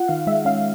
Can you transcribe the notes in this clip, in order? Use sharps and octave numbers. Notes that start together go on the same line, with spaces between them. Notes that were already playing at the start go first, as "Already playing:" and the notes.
Already playing: F4 F#5
D#3 F5
G#3 E5
C#4 F5